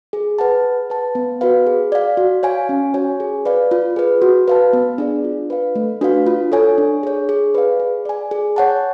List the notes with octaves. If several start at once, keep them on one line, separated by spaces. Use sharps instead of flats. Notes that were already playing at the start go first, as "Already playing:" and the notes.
G#4
B4 F#5 A5
G#4
B4 F#5 A5
B3
F#4 B4 F5
G#4
D5 F5
F#4
C#5 F5 G#5
C#4
F#4 C#5 G#5
G#4
B4 D5 F5
F4
G#4 B4
F#4
B4 F5 A5
B3
D4 G#4 D5
F4
B4 F5
A3
D4 F#4 B4 F5
F4
A4 C#5 G#5
D4
G#4 C#5
G#4
B4 D5 F5
G#4
D5 G#5
G#4
C#5 F#5 A5